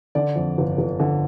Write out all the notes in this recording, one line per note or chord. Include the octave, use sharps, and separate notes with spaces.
D3 D5
F2
G1
G1
D3